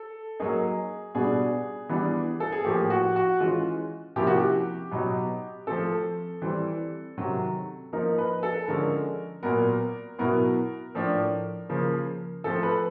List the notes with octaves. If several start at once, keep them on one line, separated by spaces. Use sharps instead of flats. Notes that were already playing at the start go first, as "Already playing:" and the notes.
Already playing: A4
F#3 A#3 D#4 G#4
B2 G3 B3 D4 G#4
E3 G3 B3 D4
A4
G#4
A2 F3 A#3 G4
F#4
F#4
E3 G#3 C#4 F4
C3 F3 A#3 C#4 E4 G4
F#4
G4
B2 F#3 B3 D#4
F3 A3 C4 A4
E3 G3 C4
C3 D#3 F#3
F3 A#3 D#4 A#4
B4
A4
D3 F3 G#3 C#4 A#4
A#2 F#3 B3 A#4
B2 F#3 B3 E4 A#4
A2 F3 A3 D4
C#3 F3 A#3
F3 A3 C4 A4
B4